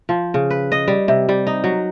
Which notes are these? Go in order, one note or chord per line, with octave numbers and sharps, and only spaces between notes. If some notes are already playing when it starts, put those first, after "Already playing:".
F3
C#3
B4
D#5
G3
C3
G3
D#4
F#3